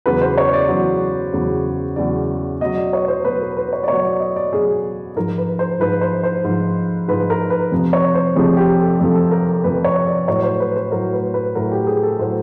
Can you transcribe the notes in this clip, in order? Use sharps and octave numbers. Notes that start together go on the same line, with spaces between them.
E2 C#3 F#3 B4
C5
C#5
D5
E2 C#3 F#3
E2 C#3 F#3
E2 C#3 F#3 D5
B2 F#3 D#5
D5
C#5
C5
B2 F#3 B4
A#4
B4
C#5
D5
B2 F#3 C#5
D5
D#5
D5
B2 F#3 G#4
G#2 F3 A#4
B4
C5
G#2 F3 B4
C5
C5
G#2 F3
G#2 F3 B4
A#4
B4
F2 C3 F3
C#5
C5
F2 C3 F3 G#4
G4
A4
F2 C3 F3 A4
A4
A#4
A#4
F2 C3 F3 B4
C#5
D5
A2 F#3 C#5
C5
B4
C5
A2 F#3 A#4
B4
B4
A2 F#3 A#4
G4
G#4
A4
A2 F#3 C5